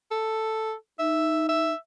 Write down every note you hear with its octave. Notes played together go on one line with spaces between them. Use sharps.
A4
D#4 E5
E5